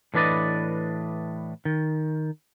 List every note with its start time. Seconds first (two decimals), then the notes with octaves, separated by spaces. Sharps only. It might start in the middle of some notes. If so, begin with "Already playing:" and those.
0.14 A2 E3 D4 B4 D5 D#5
1.65 D#3